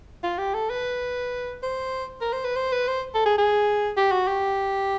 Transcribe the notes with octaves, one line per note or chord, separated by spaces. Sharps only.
F4
G4
A4
B4
C5
A#4
C5
B4
C5
B4
C5
A4
G#4
G#4
G4
F#4
G4